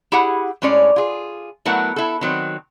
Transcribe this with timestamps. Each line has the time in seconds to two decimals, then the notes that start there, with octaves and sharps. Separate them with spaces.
0.12 E4 G4 G#4 F#5
0.62 A2 G#3 C#4 C#5 D5
0.96 F4 G#4
1.65 F#3 A3 B3 E4 A#4 F#5
1.96 E4 A4
2.21 D#3 F#3 C4